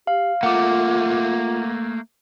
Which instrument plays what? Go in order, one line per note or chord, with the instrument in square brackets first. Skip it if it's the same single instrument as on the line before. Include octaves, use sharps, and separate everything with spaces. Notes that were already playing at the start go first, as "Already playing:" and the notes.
[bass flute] G4 [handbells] F5
[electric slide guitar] A3 A#3 [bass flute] F4 [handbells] F#5 D6